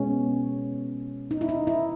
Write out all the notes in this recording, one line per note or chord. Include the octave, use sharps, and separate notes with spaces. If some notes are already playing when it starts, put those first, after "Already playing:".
Already playing: B2 G#3 B3 C#4
D#4
E4
D#4
E4